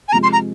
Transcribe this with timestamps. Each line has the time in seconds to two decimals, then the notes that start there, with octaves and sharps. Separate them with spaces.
0.08 G#5
0.12 C3 F3 G#3 A#5
0.23 C6
0.33 A#5